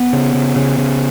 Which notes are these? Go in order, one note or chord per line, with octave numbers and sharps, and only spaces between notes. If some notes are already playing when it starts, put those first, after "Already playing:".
Already playing: B3
C#3
C#3
C#3
C#3